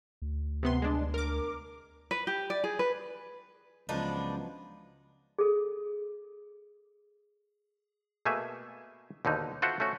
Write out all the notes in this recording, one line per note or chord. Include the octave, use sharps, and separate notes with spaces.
D2
C3 B3 C6
G#3 D4
A#4 D6
B4
G4
D5
G#4
B4
C#2 F3 F#3 B3 D4 D#4 B4
G#4 A4
B2 A3 A#3 G#4 E5 G#5
D#2 B2 D3 D#4
F4 F#4 A4 C5 E5 F#5
A3 C#4 F#4